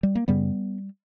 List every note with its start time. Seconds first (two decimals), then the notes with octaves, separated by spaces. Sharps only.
0.03 G3
0.15 A#3
0.28 F#2 C#3 G3 B3